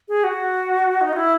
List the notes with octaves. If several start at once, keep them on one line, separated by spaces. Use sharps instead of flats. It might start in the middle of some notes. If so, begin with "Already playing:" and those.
G#4
F#4
D#4
F#4
E4